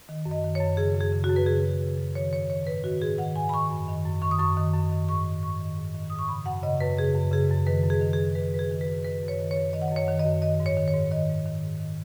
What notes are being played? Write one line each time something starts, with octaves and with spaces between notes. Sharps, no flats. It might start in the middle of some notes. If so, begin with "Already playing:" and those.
D#3
F#2
D#5
D#3
C#5
F#2
C#3 G#4
F#2
G#4
C#3
F#4
F#2
B4
C#3 G#4
F#2
C#3
F#2
D#3 C#5
G#2 C#5
D#3 C#5
G#2 B4
D#3 F#4
G#2 G#4
D#3 F#5
G#2 G#5
B5
D#3 C#6
F#2
D#3
F#2
D#3 C#6
D#6
F#2 C#6
D#3
F#2
D#3
G#2 C#6
D#3
G#2 C#6
D#3
G#2
D#3
G#2 D#6
C#6
C#3 B5
F#2 F#5
C#3 D#5
F#2 B4
C#3 G#4
F#2
C#3 G#4
F#2
D#3 B4
F#2
G#4
D#3
G#4
F#2
D#3 B4
F#2 B4
G#4
D#3
B4
F#2
D#3 B4
F#2
C#5
D#3
C#5
F#2
D#3 D#5
F#5
D#5
F#2 C#5
D#3
D#5
F#2
D#3 D#5
G#2
C#5
D#3
C#5
G#2
D#3 D#5
G#2
D#3
G#2
D#3